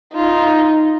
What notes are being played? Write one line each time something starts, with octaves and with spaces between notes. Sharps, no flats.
D#4 F4